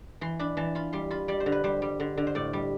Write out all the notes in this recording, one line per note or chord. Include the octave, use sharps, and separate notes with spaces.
E3 C6
D4 B5
E3 A5
F4 B5
G3 C6
F4 B5
G3 D5
C5
D3
B4
G3 C5
G3
D3
D3
C5
A2 D5
G3